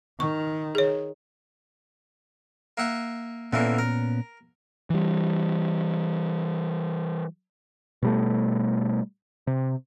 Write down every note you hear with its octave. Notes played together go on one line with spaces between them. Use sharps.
D#3 C#6
G#4 C#5
A#3 E5 F#5
A#2 D3 E3 A#3 B3 C#4
A#4
E3 G3
B2 G3 A3
C3